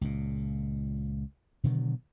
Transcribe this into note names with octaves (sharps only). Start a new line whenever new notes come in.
C#2 A#2
B2 D3 D#3 F#3